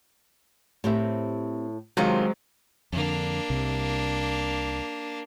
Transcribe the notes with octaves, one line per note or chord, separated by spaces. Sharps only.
A2 C4 G4 A#4 E5
C3 D#3 F#3 G#3 A#3 C4 F4
F2 D3 A#3 D4
C2 C3